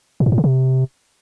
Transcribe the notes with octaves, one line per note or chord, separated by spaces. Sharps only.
A#2
G#2
A2
C#3
C3